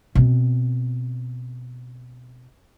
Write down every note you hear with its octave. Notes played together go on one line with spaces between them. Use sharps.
B2 C4